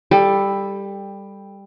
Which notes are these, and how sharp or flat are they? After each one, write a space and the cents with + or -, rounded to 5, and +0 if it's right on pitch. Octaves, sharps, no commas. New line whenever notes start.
G3 +15 A4 +0